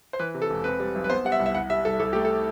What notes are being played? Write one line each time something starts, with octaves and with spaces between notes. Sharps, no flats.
C5
E3 B4
C3
A4
E1
C4 B4
G3
B1
B4
B3 C5
G3 F#5
E5
C2
E5
C2 F#5
G3 E5
C2 A4
C2 A4
A3 G4
A4